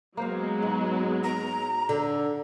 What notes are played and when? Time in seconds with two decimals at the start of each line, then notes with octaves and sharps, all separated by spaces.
0.17 F#3 G#3 A#3 B3 C5 F5
0.62 G#2
1.24 A#5
1.89 D3